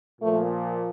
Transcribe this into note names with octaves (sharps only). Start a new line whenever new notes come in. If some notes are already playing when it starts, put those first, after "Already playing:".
A#2 F3 A3